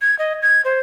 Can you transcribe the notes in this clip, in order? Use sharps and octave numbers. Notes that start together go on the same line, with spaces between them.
G#6
D#5
G#6
C5